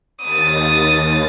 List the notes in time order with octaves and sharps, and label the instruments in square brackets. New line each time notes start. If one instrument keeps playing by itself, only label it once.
[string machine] D#2 A6 [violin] D#6